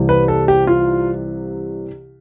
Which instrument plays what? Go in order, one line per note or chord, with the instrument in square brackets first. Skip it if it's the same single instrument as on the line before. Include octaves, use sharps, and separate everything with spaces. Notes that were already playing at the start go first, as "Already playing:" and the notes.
Already playing: [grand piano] C2 C3 E3
[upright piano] B4
A4
G4
F4